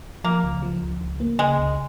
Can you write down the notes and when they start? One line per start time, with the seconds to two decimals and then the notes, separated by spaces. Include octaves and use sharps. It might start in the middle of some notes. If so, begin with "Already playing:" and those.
0.24 F3 A#3
0.43 C#2
0.62 F3
0.81 C#2
1.01 C#2
1.20 A#3
1.39 C#3 G#3
1.59 C#2